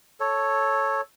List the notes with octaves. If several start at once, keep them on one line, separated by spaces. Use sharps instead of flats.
A4 C#5